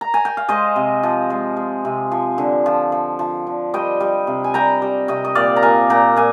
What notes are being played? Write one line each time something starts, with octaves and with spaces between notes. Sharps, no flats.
A#5
G#5
G5
F5
G#3 C5 D#5
C3
F3
G#3
G#3
C3
F3
D3
F3
F3
F3
D3
G3 D#5 G5
G3
C3
G#5
G3 G5 A#5
G3
C3 D#5 G5
D#5
A#2 D5 F5
A#5
A#2 F5 G#5
A#2 G5 A#5
A#2 F5 G#5